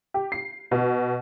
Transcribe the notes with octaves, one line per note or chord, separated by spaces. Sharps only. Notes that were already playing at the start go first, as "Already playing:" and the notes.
G4
C7
B2